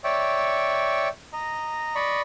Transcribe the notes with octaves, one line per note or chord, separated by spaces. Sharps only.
C#5 D5 E5 G5 C#6
D#5 A#5
D5 D#5 B5 C#6